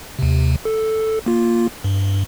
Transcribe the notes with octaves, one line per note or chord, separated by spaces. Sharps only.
D#2 C3
A4
A#3 F4
G2